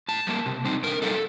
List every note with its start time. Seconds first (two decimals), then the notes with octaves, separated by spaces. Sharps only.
0.08 A2 A5
0.27 G3 A#3
0.46 C3
0.65 G3 C4 D#4
0.83 D3 A#4
1.02 G3 A#3 D#4 A4